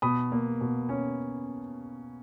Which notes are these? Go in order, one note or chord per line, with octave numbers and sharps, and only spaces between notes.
B2 B5 D#6
A#3
B2
C#4